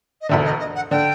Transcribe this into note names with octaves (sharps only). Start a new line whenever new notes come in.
D#5
E1 D2 D3 E5
D#5
D#5
F#5
D3 G5